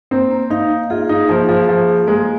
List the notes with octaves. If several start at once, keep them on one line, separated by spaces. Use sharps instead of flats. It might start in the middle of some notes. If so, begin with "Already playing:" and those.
A#3 C4
A#3
D#4 F5
A#3
F4 G#4
D#4 G#4
F3 A#3
F3 G#4
F3 A#3
G#4
G#3 A#3